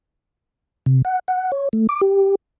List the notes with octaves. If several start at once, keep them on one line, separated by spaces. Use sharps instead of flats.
C3
F#5
F#5
C#5
A3
D6
G4